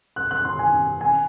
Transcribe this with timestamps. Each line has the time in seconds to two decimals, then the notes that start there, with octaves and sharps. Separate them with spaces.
0.16 F#6
0.31 F#6
0.45 C6
0.59 G#5
1.01 G#5